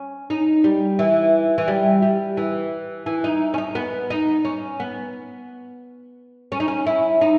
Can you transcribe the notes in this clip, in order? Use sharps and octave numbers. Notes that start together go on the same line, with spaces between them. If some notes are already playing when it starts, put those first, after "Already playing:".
Already playing: C#4
D#4
G3
E3
E3
G3
G3
E3
E3
D#4
C#4
D#4
B3
D#4
C#4
B3
C#4
D#4
C#4
E4
D#4